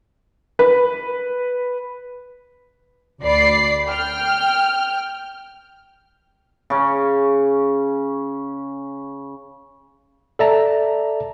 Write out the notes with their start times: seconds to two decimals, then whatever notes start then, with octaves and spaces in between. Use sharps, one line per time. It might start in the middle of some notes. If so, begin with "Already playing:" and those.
0.59 B4
3.23 D2 D5 B5 C7
3.87 G5 F6
6.70 C#3 C#4
10.39 A4 D5 E5 A5 A#5